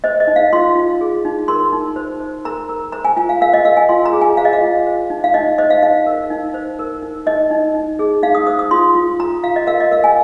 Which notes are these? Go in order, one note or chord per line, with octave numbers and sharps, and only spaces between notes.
C5 D#5
D#5
D#4
F5
F4 C6
F4
G#4
D#4
A#4 C6
D#4
C5
C5
A#4 A#5
A#4
C5 A#5
G#5
F4 G#5
F5
A#4 F5
D#5
A#4 F5
G#5
F4 C6
A#5
G#4
G#5
C5 F5
D#5
F5
F4
C5
D#4
F5
D#4 D#5
C5 D#5
F5
D#4 F5
A#4
D#4
C5
A#4
D#4
D#4 D#5
D#4
D#4
G#4
D#4 F5
D#6
C5 D#6
D#6
F4 C6
F4
F4 A#5
F4 F5
D#5
A#4 F5
D#5
A#4 F5
G#5